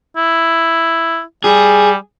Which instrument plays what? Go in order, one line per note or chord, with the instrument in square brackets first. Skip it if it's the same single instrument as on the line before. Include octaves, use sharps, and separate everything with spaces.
[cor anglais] E4
[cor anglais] G3 [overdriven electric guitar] G#4